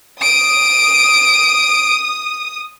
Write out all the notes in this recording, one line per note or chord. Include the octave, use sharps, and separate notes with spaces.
D#6 D7